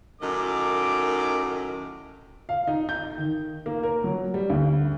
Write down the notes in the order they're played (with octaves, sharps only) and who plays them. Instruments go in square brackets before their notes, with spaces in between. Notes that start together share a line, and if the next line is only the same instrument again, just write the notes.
[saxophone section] F#2 A2 D#3 [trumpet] D6
[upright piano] F5
D#4
G6
D#3
A#3
A#4
F#3
G3
D2